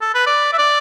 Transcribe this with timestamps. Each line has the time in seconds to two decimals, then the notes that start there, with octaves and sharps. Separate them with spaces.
0.01 A4
0.14 B4
0.26 D5
0.53 E5
0.58 D5